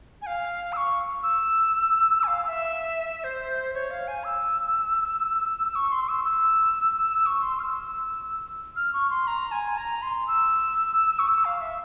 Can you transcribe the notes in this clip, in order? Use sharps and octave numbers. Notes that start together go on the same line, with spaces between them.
G#5
F5
E6
C#6
E6
G#5
F5
E5
C5
C#5
F5
G#5
E6
C#6
C6
E6
E6
C#6
C6
F6
E6
F6
C#6
C6
A#5
G#5
A#5
C6
E6
C#6
E6
F5
E5